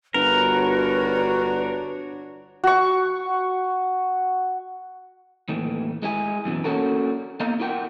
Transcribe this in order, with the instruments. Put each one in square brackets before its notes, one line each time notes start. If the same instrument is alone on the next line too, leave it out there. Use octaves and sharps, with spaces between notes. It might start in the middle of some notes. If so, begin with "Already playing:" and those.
[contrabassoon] G1 [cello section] D4 F#4 C#5 [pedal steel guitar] A#4 [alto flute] B4
[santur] F#4 C#6
[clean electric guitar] D#2 A2 E3
G#3 E4 G#4
F#2 B2 D3 E3
A#3 C#4 D4 F#4 A4 A#4
A#3 B3 D#5 F5 A#5
E4 F4 A#4 F#5 G5